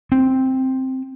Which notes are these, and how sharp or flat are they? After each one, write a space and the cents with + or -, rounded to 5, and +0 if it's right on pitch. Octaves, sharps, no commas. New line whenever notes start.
C4 +5